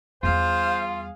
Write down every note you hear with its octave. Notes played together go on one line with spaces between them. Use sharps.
E2 G3 F4 G#4 C5 F5